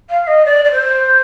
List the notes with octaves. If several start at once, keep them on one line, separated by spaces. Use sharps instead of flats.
F5
D#5
D5
D5
C5